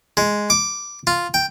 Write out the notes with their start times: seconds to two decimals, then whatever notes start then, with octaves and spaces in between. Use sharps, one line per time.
0.17 G#3
0.50 D6
1.07 F4
1.34 G5